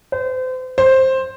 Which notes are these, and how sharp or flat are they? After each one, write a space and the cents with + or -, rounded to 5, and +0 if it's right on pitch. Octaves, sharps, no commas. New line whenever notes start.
C5 -35
C5 +10